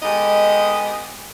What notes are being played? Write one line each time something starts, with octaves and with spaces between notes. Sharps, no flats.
G#3 B3 D#4 G4 A4 D#5